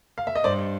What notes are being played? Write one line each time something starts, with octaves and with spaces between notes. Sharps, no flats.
F5
E5
D#5
G2 C5 D5